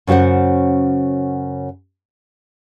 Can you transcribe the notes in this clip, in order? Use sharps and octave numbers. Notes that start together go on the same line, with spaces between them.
F#2 C#3 F#4 C5 F#5